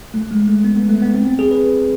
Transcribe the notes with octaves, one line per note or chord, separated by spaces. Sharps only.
A3
G#3
A3
B3
B3
A3
B3
C4
C4
G#4
B4